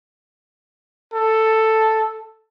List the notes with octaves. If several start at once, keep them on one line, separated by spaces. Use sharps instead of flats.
A4